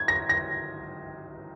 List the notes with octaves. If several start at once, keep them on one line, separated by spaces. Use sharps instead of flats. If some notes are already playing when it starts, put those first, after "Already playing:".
Already playing: G#6
A#6
A#6